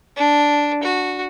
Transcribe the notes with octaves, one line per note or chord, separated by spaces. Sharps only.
D4
F#4